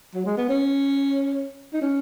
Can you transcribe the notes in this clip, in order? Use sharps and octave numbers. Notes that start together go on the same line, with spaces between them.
F#3
G#3
B3
C#4
D#4
C#4